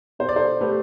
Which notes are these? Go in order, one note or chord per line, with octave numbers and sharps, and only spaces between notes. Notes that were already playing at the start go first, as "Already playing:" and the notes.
B2 C5
D5
A4 C5
A3 G4 B4